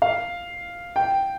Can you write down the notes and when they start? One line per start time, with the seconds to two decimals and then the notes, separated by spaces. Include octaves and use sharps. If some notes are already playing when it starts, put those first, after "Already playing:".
0.02 F5
0.96 G5